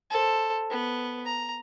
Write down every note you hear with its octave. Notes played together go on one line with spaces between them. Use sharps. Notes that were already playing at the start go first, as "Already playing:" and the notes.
A4 C5
B3
A#5